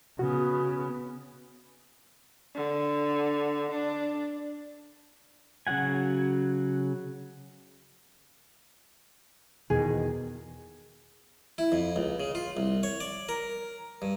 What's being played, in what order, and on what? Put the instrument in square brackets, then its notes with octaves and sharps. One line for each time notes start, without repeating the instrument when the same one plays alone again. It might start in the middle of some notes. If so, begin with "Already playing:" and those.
[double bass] C#3 B3 [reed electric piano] F#4
[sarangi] D3
D4
[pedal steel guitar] C#3 F#3 F#4 F#5 G#5
[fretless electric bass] E2 B2 D#3 [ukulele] G#4
[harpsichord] E4
F2
C#2
C#3
F4
C2
C#5
D5
A#4
G2